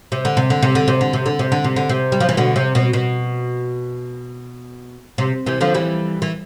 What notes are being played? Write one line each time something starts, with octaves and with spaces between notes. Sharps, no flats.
C3
D3
C3
D3
C3
D3
C3
D3
C3
D3
C3
D3
C3
D3
C3
G3
F3
E3
B2 D3
C3
B2
B2
C3
C3 E3
D3 F3
E3 G3
E3